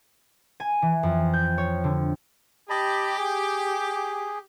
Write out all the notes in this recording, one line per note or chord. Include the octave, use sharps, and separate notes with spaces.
G#5
E3
F2
G6
C#5
D3
G4 D#5 A5 B5
G#4